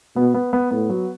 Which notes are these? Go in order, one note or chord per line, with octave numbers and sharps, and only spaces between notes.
B2 B3
B3
B3
A2 B3
F#3